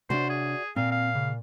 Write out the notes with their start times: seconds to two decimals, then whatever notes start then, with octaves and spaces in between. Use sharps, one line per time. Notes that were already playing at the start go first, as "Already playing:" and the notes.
0.10 C3 D4 F#4 C5 D5 E5
0.30 G#4
0.76 A#2 C4 F5
0.92 F5
1.15 C#3